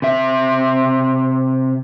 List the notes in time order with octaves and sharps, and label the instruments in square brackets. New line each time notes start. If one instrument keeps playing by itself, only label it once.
[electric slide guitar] C3 E5